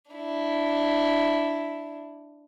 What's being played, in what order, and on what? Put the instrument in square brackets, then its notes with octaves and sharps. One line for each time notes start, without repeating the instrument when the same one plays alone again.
[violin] D4 E4